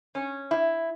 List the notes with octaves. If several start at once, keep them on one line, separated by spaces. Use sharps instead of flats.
C#4
E4